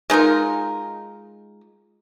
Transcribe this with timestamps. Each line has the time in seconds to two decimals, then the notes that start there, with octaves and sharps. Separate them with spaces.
0.10 G#3 D#4 F4 A#4